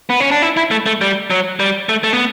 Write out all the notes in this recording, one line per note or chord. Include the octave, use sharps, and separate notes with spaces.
B3
C#4
D4
E4
E4
A3
A3
G3
F#3
G3
A3
A3
B3